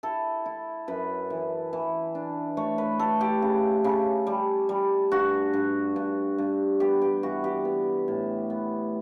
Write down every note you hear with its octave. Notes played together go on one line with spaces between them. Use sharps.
E4 A4
E4
F#2 B4
E3
E3
D4
A3 C#5
B4
A3 A4
G4
C#3
C#3
G3
G3
G2 F#4
G2
G2
G2
B3 G4
G4
E3 F#4
G4
B3
A2
B3